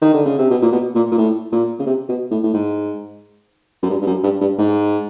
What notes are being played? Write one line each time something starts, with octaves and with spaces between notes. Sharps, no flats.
D#3
D3
C#3
C3
B2
A#2
B2
A#2
A#2
A2
A#2
C#3
C3
B2
A2
A2
G#2
F#2
G2
G2
F#2
G2
G2
G#2